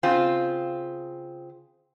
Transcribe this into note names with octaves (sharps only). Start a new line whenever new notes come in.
C#3 C4 F4